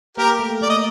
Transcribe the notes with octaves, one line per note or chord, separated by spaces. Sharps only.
A#3 G4 A#4
A3
A#3 D5
D#5